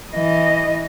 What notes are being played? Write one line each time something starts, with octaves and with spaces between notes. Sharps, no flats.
E3 D#5